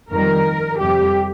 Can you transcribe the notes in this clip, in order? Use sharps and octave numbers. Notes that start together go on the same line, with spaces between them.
F2 D#3 G3 A#4
F2 C3 G3 G4